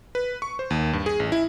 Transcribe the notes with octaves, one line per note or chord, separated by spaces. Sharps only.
B4
C#6
C5
D#2
G2
G#4
A1
E4